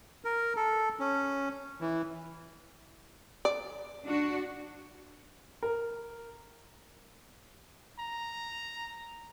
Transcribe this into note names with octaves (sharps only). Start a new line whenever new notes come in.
A#4
A4
C#4
E3
D5
D4 F#4
A#4
A#5